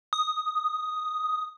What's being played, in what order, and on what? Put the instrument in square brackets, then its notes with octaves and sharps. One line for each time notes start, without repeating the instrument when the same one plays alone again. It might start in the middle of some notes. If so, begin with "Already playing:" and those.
[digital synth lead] D#6